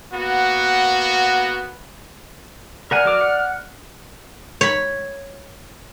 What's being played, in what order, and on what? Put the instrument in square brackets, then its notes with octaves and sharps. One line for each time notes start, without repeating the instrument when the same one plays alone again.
[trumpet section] A#3 B3 F#4
[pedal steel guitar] A#4 F#5 G#5 [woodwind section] D5 F6
[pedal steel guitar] F#3 A#4 D6
F#5
[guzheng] C#5 B5